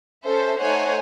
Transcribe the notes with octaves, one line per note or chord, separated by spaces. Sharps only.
C#4 A4 C5 E5
A3 D#4 C5 C#5 F#5 G#5